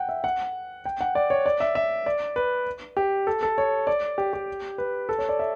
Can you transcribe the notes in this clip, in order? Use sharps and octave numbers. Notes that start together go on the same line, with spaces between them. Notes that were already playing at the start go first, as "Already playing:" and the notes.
Already playing: F#5 G5
E5
F#5
G5
F#5
D5
C#5
D5
E5
E5
D5
B4
G4
A4
A4
C#5
D5
G4
G4
B4
A4
C#5
D5
E5